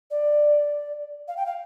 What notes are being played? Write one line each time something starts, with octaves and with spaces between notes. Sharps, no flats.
D5
F5
G5
F5